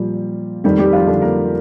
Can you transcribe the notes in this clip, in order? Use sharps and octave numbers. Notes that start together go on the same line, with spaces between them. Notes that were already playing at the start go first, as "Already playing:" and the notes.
Already playing: A#2 F3 G3
F2 D#3 G3 G4
G3 G4
F3 F4
D3 D4
A#3 A#4